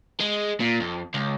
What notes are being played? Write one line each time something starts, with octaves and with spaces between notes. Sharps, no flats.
G#3
A#2
F2
C#2